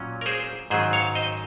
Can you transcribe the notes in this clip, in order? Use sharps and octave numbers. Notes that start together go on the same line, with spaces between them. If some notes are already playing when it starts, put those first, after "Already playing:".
Already playing: A#2 F#3 C#4
A#4
G#4 C5
G#2 D#3 F#3 C#4 G#4 C5
C#5 F5
C5 D#5